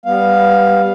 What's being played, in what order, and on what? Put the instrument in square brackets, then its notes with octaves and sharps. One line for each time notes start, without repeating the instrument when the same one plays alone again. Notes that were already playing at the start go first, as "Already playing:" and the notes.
[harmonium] G3 B3 F5